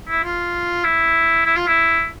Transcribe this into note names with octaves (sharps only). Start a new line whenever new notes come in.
E4
F4
E4
E4
F4
E4